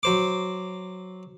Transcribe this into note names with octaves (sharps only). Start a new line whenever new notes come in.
F#3 C5 D6